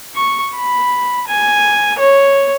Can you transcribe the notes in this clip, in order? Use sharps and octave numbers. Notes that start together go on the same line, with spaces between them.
C#6
B5
G#5
C#5